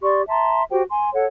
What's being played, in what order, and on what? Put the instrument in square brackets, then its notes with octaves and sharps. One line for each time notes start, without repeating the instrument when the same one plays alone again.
[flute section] G4 D5 C6 C#6
E5 A5 A#5 C6
F#4 G4 C5 G5
G#5 C6
A4 C#5 F#5